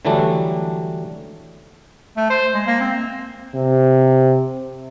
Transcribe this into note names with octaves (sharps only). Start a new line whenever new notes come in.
D3 E3 F#3 G3 A3 D4
A3
C5
G#3
A#3
C4
C3